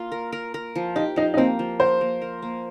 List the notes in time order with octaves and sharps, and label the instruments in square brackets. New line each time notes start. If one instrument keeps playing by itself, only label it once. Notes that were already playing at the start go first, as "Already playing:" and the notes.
Already playing: [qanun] A#3 F4
A#4
A#4
A#4
F3
[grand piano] D#4 [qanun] G4
[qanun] F3 [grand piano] D#4
[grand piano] D#4
[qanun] A#3 [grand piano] C4
[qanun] F3
[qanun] A#4 [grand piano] C5
[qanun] A#3
A#4
A#3